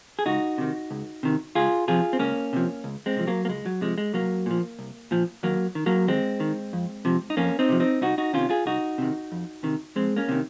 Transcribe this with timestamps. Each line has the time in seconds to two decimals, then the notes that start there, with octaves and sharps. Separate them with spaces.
0.19 G#4
0.26 C#2 D#4 F#4
0.58 C3 D#3
0.91 C#2
1.23 C3 D#3
1.55 C#2 F4 G#4
1.88 C3 F3 F4 G#4
2.13 C4
2.19 C#2 A#3 C#4
2.53 C3 F3
2.84 C#2
3.06 G#3 C4
3.16 C3 F3
3.27 F#3 A#3
3.45 A#3
3.49 C#2 G#3
3.66 F#3
3.81 C3 F3 G#3
3.98 G#3
4.13 C2 F#3 A#3
4.46 A#2 F3
4.79 C2
5.11 A#2 F3
5.43 D#2 F#3 A#3
5.75 D#3
5.86 F#3 A#3
6.07 D#2 G#3 C4
6.40 D#3
6.73 F2
7.05 C3 F3
7.30 D#4
7.37 F2 A#3 C#4
7.59 C4 D#4
7.69 C3 F3
7.80 C4 D#4
8.01 C2 D#4 F#4
8.18 D#4 F#4
8.33 C3 D#3 C#4 F4
8.50 F4 G#4
8.65 C2 D#4 F#4
8.98 C3 D#3
9.32 F2
9.63 C3 D#3
9.96 F2 G#3 C4
10.16 A#3 C#4
10.29 C3 D#3